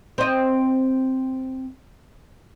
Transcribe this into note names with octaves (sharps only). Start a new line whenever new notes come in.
C4 D#5